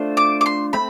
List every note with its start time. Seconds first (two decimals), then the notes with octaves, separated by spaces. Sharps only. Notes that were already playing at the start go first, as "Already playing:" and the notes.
Already playing: A3 D4 F4 C5
0.17 D6
0.41 D6
0.46 C6
0.73 A3 C4 B5